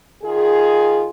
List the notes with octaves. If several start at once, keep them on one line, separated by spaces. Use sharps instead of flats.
D#3 F4 G#4